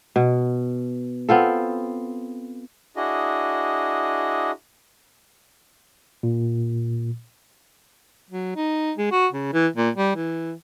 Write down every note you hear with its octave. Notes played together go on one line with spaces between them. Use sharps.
B2
B3 C4 F4 A4
D4 E4 F#4 G#4 D#5
A#2
F#3
D#4
G#3
F#4
C#3
E3
A#2
G3
E3